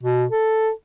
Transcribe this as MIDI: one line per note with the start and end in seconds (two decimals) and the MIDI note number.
0.03 0.24 47
0.31 0.71 69